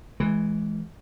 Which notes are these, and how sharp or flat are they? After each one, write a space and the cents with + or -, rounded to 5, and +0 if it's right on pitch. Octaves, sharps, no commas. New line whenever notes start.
E3 +0 G#3 +25